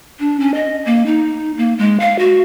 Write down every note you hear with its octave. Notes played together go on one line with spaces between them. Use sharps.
D4
C#4
D#5
A#3
D#4
A#3
G#3
F5
F#4